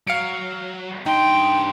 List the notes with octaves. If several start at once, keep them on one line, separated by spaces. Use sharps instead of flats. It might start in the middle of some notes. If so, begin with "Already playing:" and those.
F#3 F5 C#7 D7
G2 D#4 G5 C6